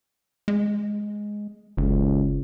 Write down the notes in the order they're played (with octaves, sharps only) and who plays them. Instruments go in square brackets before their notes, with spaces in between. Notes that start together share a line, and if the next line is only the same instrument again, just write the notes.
[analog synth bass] G#3
[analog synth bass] F#1 [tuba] C#2